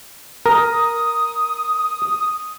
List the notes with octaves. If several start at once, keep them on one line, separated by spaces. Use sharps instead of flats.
A#4 D#6